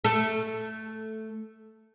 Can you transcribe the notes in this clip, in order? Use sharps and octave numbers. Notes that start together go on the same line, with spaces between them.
A3 A4